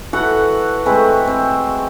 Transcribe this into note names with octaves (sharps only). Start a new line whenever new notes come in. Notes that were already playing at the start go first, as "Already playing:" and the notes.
E3 F#4 A4 F#5
G#3 A3 C4 B4
C4